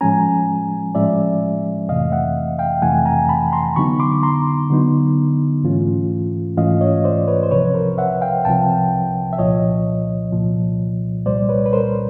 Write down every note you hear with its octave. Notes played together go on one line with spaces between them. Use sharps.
A2 F3 G#3 C#4 G#5 A#5
A2 F3 G#3 C#4 D5 E5
F2 C3 E3 A3 D#5 F5
E5 F#5
F5 G5
F2 C3 E3 A3 F#5 G#5
G#5 A#5
A5 B5
A#5 C6
D3 F#3 B3 D#4 B5 C#6
C6 D6
A#5 C6
D3 F#3 B3 D#4
G#2 E3 A3 C#4 F4
G#2 E3 A3 C#4 F4 D#5 F5
C#5 D#5
C5 D5
B4 C#5
C5
C2 C3 F3 B4 C#5
A#4 C5
E5 F#5
F5 G5
C2 C3 F3 G5 A5
E5
C2 A#2 F3 C#5 D#5
C2 A#2 F3
C2 A#2 G3 C5 D5
B4 C#5
B4
A#4 C5